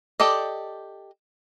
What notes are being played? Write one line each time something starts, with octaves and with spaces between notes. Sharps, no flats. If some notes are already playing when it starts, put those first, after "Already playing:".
G4 A4 D5 D#5